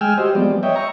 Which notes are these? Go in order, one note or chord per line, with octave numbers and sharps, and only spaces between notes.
G#3 G5 G#5 E6 F6
F#4 G4 C5 D#5
F3 G3 G#3 B3 C4 D5
C#5 D#5 E5 G5
A#5 C#6